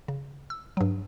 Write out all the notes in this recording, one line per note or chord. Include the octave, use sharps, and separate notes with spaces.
C#3
E6
G2 F#3